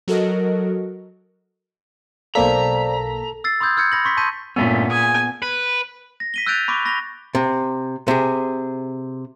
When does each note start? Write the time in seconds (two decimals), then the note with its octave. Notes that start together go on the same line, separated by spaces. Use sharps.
0.08 F#3 F#4 A4 A#4 D#5
2.35 B1 A#3 A4 C5 D5 F5 A#5 B6
3.44 E6 A6 C7
3.60 B5 C6 D#6 E6 G6 G#6
3.77 E6 F6 G6 G#6 C#7
3.92 B5 A#6 F#7
4.05 C6 C#6 B6
4.17 A5 C6 C#6 G6 B6 D#7
4.56 G2 A#2 A3 B3 C#4
4.91 G#4 G#5
5.42 B4
6.20 A#6
6.34 B6 D#7 G7
6.46 E6 F#6 G6 A6 D7 F7
6.68 B5 C#6 D6 D7
6.85 B5 A#6 G7
7.35 C3
8.08 C3 G#4